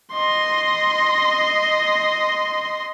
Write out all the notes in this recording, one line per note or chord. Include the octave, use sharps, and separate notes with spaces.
D#5 C6